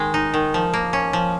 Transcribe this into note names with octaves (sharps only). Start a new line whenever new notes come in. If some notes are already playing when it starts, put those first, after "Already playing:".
Already playing: D#3 G#3
D#4
D#3
F3
A#3
C#4
F3